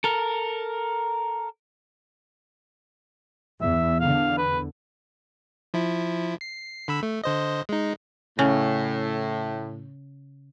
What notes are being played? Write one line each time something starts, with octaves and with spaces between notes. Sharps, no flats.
A4 A#4
E2 E5
E2 D3 F5
B4
F3 E4
C7
D3 B5 E6
A3
D3 C5 D#5
G#3 D#4
A2 C#3